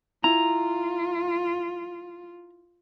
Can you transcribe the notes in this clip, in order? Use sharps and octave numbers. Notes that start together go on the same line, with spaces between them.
E4 F4 A#5